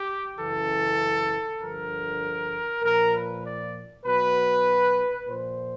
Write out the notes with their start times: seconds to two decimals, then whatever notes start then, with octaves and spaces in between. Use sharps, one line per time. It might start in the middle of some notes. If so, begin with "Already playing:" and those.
Already playing: G4
0.38 F#2 C#3 E3 A4
1.60 G2 D3 F3 A#4
2.82 A#2 F3 A#4
3.14 B4
3.44 D5
4.05 B2 F#3 B4
5.27 A#2 F3 C5